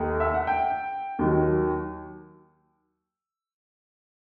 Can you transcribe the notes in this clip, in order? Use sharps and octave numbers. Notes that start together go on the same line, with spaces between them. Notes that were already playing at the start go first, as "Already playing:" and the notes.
Already playing: D#2 D#3 A3 D#4
E5
F#5
G5
D#2 D#3 F#3